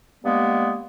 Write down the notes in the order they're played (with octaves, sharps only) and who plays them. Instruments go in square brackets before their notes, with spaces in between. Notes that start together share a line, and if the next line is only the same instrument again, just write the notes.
[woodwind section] G2 G#3 A#3 B3